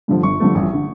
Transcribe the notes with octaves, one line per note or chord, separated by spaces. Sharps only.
G2 D3 F3 A3
G1 C#6
G2 D3 F3 A3
A1
D3